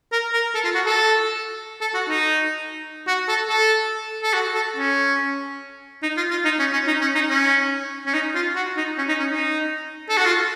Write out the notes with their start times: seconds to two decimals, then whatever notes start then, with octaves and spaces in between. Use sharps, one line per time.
0.12 A#4
0.33 A#4
0.54 A4
0.64 F4
0.75 F#4
0.86 A4
1.81 A4
1.94 F#4
2.09 D#4
3.07 F#4
3.28 A4
3.49 A4
4.23 A4
4.33 F#4
4.55 A4
4.76 C#4
6.02 D#4
6.17 F4
6.31 F4
6.45 D#4
6.59 C#4
6.73 C#4
6.87 D#4
7.01 C#4
7.15 D#4
7.29 C#4
8.06 C#4
8.13 D#4
8.35 F4
8.55 F#4
8.77 D#4
8.98 C#4
9.08 D#4
9.19 C#4
9.30 D#4
10.09 A4
10.17 F#4
10.25 F4